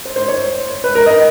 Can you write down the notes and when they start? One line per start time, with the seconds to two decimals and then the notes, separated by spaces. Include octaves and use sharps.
0.05 C5
0.16 C5
0.28 C#5
0.84 B4
0.95 A#4
1.06 D#5